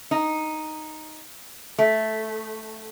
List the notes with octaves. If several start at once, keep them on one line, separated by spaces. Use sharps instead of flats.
D#4
A3